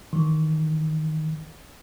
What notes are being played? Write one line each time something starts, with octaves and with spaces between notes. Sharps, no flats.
D#3 E3